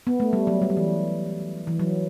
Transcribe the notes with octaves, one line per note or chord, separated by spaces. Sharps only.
B3
A3
G3
F#3
G3
F#3
E3
E3
F#3